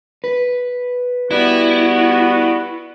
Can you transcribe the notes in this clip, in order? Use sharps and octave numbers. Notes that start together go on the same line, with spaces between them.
B4
G3 B3 E4 F#4